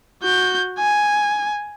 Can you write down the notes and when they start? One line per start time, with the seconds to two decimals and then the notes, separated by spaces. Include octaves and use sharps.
0.23 F#4 G6
0.79 G#5